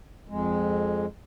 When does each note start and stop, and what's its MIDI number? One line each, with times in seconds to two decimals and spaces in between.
0.29 1.06 41
0.29 1.06 56